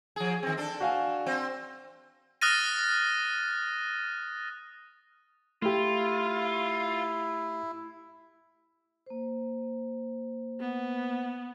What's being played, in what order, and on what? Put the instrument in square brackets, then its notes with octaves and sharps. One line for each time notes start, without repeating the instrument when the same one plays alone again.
[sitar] F3 G#4
D#3 C4
D4 A4
[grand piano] F#4 F5 G#5
[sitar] C4 C5
[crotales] D#6 F6 F#6 A6 A#6 D#7
[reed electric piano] A3 G4 [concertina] E4 [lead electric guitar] F4
[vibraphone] A#3 C5
[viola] B3